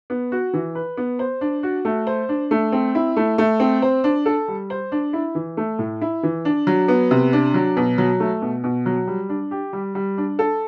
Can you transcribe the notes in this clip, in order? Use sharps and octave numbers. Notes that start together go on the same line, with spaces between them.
B3
F#4
E3
B4
B3
C5
D4
F#4
A3
C5
D4
A3
C4
E4
A3
A3
C4
C5
D4
A4
G3
C5
D4
E4
E3
A3
A2
E4
E3
D4
F#3
B3
C3
D4
F#3
B2
F#3
A3
B2
B2
F#3
G3
D4
G4
G3
G3
D4
A4